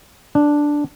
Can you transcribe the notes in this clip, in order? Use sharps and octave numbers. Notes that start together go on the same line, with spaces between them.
D4